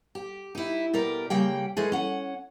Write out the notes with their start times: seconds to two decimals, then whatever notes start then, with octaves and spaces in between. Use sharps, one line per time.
0.15 G4
0.55 D#4 E4
0.93 B2 G4 A#4 D5
1.30 C#3 G3 A#3 G5
1.77 E3 G#3 A3 G#4
1.92 C#4 F#5